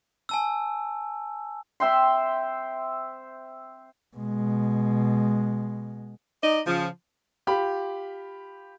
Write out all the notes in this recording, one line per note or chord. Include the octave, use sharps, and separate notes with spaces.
G#5 A5 E6
C4 E5 G5 C6
B2 G#3
D#4 D5 D#5
C#3 F3
F4 G4 B5